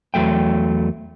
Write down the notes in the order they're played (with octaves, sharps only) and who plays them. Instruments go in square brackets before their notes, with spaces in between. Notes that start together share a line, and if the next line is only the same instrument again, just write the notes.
[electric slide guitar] E2 F#3 A3 G5